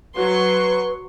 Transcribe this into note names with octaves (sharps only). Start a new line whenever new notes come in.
F#3 B4 C6 C#6